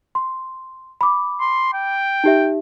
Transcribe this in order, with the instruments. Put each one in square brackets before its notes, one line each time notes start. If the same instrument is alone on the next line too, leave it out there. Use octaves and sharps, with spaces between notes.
[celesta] C6
B5 D6
[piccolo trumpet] C6
G5
[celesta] D#4 G4 E5